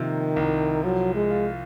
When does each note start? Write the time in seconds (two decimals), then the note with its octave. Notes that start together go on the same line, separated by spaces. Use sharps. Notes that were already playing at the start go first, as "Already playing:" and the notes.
Already playing: C3 D#3 F3 A#3
0.36 C2
0.83 F3 F#3
1.15 G#3
1.31 F4